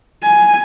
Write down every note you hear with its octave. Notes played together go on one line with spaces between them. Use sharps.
G#5